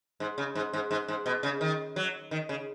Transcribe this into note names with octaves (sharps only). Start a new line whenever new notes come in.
G#2
C#3
G#2
G#2
G#2
G#2
B2
C#3
D#3
F#3
D#3
C#3